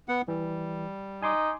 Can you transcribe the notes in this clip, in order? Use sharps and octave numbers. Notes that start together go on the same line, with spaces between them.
B3 F#5
E3 G3
D#4 G#5 C6 D6